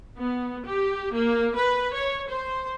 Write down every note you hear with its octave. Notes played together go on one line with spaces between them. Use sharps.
B3
G4
A#3
B4
C#5
C5